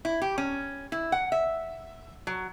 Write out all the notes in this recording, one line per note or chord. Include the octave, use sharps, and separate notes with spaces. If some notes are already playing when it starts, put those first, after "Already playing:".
E4
G4
C#4
E4
F#5
E5
F#3